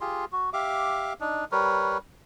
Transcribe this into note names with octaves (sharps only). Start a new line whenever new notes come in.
F4 G4 G#4 C6
F#4
G4 E5 F5 D6
D4 D#4
G3 A#4 B4 C#5